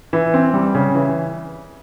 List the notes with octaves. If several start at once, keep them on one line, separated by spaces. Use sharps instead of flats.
E3
C4
G3
C#3
E3